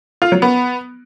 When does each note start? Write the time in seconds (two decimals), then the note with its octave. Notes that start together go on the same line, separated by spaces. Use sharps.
0.22 F4
0.32 F#3
0.42 B3